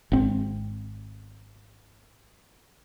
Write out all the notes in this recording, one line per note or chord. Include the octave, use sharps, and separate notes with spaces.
G#1 C4